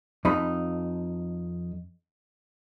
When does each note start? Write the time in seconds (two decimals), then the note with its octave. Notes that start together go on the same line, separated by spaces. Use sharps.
0.25 F2 D#4 B5